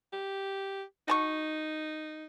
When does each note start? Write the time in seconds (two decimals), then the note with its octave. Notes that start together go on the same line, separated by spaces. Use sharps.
0.13 G4
1.08 D#4 F#4 A5 C#6